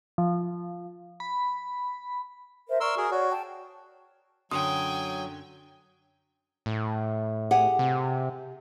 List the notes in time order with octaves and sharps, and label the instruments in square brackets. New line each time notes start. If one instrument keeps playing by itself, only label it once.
[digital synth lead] F3
B5
[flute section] A#4 C5 E5
[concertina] A#4 C6 E6 [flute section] D5 C#6
[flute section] F#4 [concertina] G#4 A#4
[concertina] F#4 [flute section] C#5 D5
[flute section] G5 A5
[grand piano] F#2 D3 C6 [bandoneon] F#3 [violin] G5 G#5 [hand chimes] D#6
[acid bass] A2
[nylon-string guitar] G4 G#4 F#5
[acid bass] C3